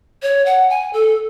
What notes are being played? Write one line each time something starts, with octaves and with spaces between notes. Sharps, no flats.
C#5
F#5
G#5
A4